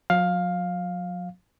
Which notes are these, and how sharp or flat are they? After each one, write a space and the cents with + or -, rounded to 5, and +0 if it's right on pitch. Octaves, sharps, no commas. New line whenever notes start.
F#3 -40 F5 +10